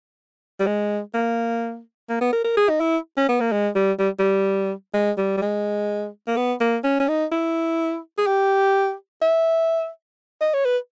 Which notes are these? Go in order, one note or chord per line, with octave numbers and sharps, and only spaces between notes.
G3
G#3
A#3
A#3
B3
A#4
A#4
G#4
D#4
E4
C#4
B3
A#3
G#3
G3
G3
G3
G#3
G3
G3
G#3
A#3
B3
A#3
C#4
C#4
D#4
E4
G#4
G4
E5
D#5
C#5
B4